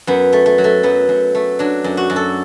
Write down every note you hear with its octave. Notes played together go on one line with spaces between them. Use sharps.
F#2 B3
A3
A3
F#3
A3
F#2 B3
F#2
A3
F#3 D4
F#2
F#4
F#2
A4